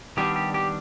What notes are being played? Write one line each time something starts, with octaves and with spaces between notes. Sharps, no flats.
D#3 G3 B3 D4 G4
G4
G4